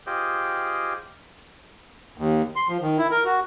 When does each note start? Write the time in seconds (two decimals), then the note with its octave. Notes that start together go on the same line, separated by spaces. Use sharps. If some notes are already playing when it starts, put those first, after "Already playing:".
0.07 F4 G4 G#4 C5 D#5 G5
2.18 D#2
2.56 C6
2.69 F3
2.81 D#3
2.98 E4
3.11 A#4
3.25 F#4